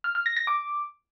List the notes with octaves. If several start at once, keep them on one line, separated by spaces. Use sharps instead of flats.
F6
F6
A#6
A#6
D6